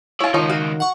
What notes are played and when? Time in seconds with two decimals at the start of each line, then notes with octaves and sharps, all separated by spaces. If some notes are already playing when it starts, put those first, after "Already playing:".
0.20 E4 C#5 F5 A5
0.34 C#2 D#3 F3 D#4 A#4 C#5
0.50 F#4 F5
0.80 F#5 C#6